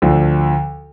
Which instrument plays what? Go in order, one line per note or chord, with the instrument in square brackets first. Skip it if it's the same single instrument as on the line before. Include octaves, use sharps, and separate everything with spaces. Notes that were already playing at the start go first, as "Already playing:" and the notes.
[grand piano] D2 D3 F3